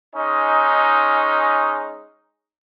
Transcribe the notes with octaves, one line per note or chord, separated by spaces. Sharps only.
G#3 C#4 D#4